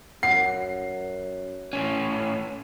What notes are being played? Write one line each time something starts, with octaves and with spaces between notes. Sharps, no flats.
F#2 F#5 C7
A2 C#4